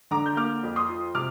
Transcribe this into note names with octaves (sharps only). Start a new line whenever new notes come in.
D3 A#5 D6
G6
A#3 D6 F6
F2
C6 D#6
F3
C3 D6 F6